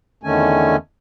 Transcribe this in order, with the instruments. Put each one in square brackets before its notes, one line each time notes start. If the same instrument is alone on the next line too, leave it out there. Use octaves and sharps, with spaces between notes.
[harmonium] E2 D3 D#3 A3 C#4 G#5